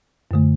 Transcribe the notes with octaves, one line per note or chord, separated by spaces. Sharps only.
F#2 D3 A3